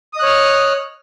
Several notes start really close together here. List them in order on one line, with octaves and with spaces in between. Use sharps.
D#6 D#5 F#6 C#5 F6